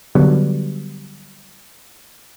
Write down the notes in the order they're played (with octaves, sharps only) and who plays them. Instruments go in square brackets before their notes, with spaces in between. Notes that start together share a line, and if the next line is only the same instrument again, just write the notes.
[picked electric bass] D3 F#3 G3 B3